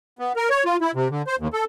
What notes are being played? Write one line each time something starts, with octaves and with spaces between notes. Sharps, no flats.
B3
A#4
C#5
F4
E4
C3
D3
C5
D#2
A4